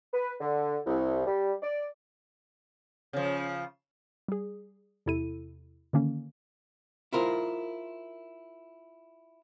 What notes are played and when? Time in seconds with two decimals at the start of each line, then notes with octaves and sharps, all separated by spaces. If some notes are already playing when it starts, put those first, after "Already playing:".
0.14 B4
0.41 D3
0.87 C2
1.26 G3
1.63 D5
3.13 C#3 F3
4.28 G3 G#4
5.06 E2 C3 E4 A4 D#7
5.93 D3 D#3 A#3 C#4
7.13 E4 F4 A#4 C5